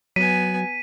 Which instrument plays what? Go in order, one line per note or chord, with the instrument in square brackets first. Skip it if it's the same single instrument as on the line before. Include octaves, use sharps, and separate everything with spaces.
[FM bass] F#3 [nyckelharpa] B3 G#5 [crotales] B6 D#7